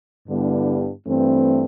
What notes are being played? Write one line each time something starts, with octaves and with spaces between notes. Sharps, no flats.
G2 D3 G3 B3 E4
G2 E3 A3 C4